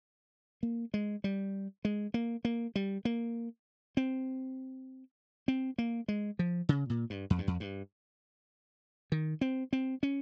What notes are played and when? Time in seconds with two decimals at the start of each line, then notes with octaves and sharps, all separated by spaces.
0.63 A#3
0.94 G#3
1.24 G3
1.85 G#3
2.14 A#3
2.45 A#3
2.76 G3
3.05 A#3
3.97 C4
5.48 C4
5.78 A#3
6.08 G#3
6.39 F3
6.69 C#3
6.90 A#2
7.10 G2
7.30 F2
7.38 G2
7.47 F2
7.60 G2
9.12 D#3
9.41 C4
9.73 C4
10.03 C#4